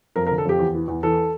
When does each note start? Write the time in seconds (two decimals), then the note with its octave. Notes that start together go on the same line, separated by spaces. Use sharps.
0.16 F2 A#4
0.26 A#4
0.31 D3
0.38 A4
0.45 F2 G4
0.59 E2
0.75 E3
0.88 E2
1.03 E3 A4